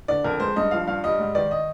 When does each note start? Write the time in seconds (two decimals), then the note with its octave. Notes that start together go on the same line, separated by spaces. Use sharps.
0.08 D3 D5
0.24 F2 A#4
0.40 G#3 C5
0.56 G2 D#5
0.71 F3 F5
0.87 G2 F5
1.04 G3 D#5
1.19 G#2
1.35 D#3 D5
1.51 D#5